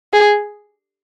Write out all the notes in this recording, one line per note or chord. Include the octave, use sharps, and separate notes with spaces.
G#4